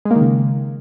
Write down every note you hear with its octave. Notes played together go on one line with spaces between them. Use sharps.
G#3
A#3
D#3
C#3